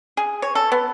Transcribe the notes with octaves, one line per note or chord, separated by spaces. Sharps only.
G#4
C#5
A4
B3